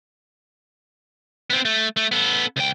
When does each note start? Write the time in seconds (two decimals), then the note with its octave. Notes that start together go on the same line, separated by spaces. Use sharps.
1.50 B3 C4
1.65 A3
1.97 A3
2.12 B3 A4
2.56 C#2 G5